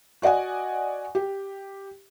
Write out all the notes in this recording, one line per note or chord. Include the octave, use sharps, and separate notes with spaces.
F#4 D5 D#5 F#5 G#5
G4